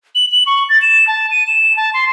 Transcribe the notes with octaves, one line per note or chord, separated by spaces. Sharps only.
F#7
F#7
C#6
A6
E7
A5
D#7
E7
A5
C6